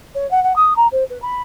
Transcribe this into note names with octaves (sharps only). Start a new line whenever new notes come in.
C#5
F#5
F#5
D#6
A#5
C5
B4
B5